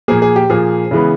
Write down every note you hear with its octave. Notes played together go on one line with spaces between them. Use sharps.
A#2 F3 A#3 G#4
G#4
G4
A#2 F3 A#3 G#4
C#3 E3 G#3 B3